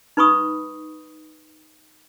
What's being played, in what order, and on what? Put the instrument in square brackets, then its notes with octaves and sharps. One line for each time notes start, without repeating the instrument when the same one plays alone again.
[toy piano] D#4 B4 B5 C#6 D#6